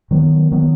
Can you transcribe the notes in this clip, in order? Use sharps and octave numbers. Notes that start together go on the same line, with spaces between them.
D#3 F#3 B3
D#3 F#3 B3